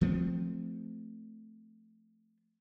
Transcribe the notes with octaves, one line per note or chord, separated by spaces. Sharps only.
F3 A3 C4